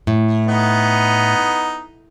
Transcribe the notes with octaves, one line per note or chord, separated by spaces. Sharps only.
A2
B3 D#4